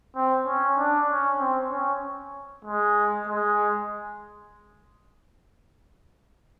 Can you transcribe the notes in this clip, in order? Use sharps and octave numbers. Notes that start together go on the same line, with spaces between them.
C4
C#4
D4
C#4
C4
C#4
G#3
G#3